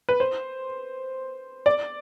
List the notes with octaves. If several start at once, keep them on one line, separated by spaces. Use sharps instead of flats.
B4
C5
D5